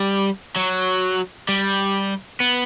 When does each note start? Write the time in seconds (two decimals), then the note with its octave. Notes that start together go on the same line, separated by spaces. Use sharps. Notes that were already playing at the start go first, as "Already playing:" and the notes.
Already playing: G3
0.56 F#3
1.49 G3
2.40 B3